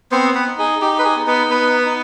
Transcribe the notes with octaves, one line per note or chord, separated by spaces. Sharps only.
B3 C4 C5
B3 B4
D#4
G#4
D#4 G4
B4
G#4
B3
B3 B4
B3 B4
D#4